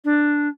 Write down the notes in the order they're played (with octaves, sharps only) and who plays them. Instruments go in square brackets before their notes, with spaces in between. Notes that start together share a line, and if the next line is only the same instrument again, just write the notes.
[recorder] D4